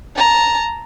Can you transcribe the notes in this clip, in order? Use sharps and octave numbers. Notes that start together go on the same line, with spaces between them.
A5 A#5